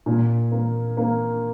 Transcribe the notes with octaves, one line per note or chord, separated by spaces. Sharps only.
A#2
A#3
A#3